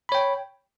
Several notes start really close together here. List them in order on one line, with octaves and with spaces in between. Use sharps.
B5 C#5 G5